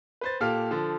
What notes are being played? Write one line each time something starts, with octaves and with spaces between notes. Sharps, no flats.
B4 C5 A6
A#2 G4 A4 F5 F6
D3 F3 A4